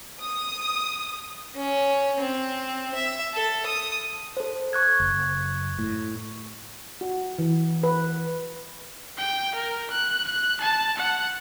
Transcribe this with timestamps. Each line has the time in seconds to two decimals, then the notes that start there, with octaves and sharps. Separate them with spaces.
0.21 D#6
1.56 C#4
2.20 C4
2.95 E5
3.34 A4
3.66 D#6
4.37 A4 C5
4.73 C#6 F#6 G#6
5.00 F#1
5.79 A2
7.01 F#4
7.39 E3
7.83 B4
9.17 G5
9.55 A#4
9.90 F#6
10.28 F#6
10.60 A5
10.97 F#5